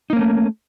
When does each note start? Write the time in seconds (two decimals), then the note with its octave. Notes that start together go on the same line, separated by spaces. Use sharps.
0.10 D#4
0.13 A#3
0.16 C#4
0.19 A3